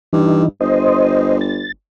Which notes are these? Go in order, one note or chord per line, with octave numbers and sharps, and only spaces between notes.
G2 E3 D#4
G1 C5 D#5
A6